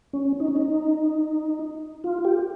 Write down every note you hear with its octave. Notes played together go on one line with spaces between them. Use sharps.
C#4
D#4
C#4
D#4
F4
G4